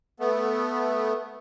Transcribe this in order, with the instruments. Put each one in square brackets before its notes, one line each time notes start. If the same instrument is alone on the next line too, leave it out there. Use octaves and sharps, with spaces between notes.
[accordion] A3 B3